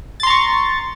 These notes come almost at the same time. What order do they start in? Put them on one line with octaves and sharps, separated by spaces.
A6 C6 A#5 C#6